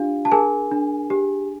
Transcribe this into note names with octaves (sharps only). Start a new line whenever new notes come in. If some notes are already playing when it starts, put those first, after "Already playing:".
Already playing: D4 F4 G4 F5
A5
G#4 A#4 G#5
D4
G4